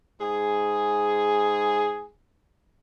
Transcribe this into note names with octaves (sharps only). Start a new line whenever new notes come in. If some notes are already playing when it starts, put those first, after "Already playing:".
G#2 G#4